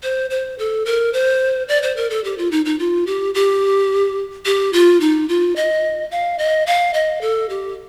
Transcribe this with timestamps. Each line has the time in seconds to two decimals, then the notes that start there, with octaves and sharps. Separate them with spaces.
0.03 C5
0.30 C5
0.59 A4
0.85 A#4
1.13 C5
1.68 D5
1.82 C5
1.96 A#4
2.10 A4
2.24 G4
2.38 F4
2.51 D#4
2.65 D#4
2.79 F4
3.07 G4
3.34 G4
4.45 G4
4.73 F4
5.01 D#4
5.29 F4
5.56 D#5
6.11 F5
6.38 D#5
6.66 F5
6.94 D#5
7.21 A4
7.49 G4